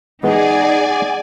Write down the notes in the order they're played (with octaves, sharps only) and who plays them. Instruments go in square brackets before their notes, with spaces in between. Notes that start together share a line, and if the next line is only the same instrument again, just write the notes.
[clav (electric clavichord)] E3 G#3 B3 [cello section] D#4 G#4 [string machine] D5 G#5 [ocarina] F#5